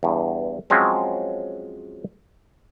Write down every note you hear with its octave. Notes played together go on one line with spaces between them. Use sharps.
E2 G2
F3 F#3 G#3 C4 C#4